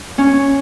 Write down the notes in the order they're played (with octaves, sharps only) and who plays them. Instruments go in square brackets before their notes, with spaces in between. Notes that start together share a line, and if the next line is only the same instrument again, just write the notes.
[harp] C#4